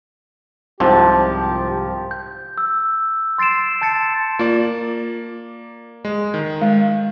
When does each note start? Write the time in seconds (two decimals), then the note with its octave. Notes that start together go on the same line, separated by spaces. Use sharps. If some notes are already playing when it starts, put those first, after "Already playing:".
0.80 C2 G#2 C3 F3 G4
2.11 G6
2.58 E6
3.38 C6 A6 C7 D7 E7
3.82 A5 G6 A6 C#7
4.39 A#3 F4 D5
6.05 G#3
6.34 D#3
6.62 G#3